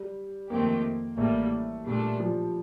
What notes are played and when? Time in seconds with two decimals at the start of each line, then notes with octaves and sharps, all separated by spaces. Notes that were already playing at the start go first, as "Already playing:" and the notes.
Already playing: G3
0.50 F2 D#3 A3 A#3 C4 G4
1.17 A1 A2 G3 A3 A#3
1.86 A#2 G3 A3 D4
2.20 F3